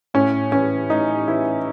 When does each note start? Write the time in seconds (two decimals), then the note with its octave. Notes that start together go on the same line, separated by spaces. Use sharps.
0.14 A2 C#4
0.52 E3 C#4
0.89 A2 D#4
1.28 E3 E4